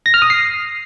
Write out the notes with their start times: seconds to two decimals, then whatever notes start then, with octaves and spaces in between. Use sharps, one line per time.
0.06 A#6
0.14 F6
0.22 D#6
0.30 C7